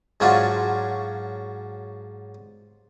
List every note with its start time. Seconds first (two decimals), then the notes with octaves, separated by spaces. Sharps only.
0.20 G#2 F#3 C#4 D4 F4 F#4